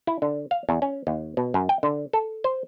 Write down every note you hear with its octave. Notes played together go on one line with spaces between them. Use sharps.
E4
D3
F5
E2
C#4
D#2
B2
F#2
G5
D3
A4
C5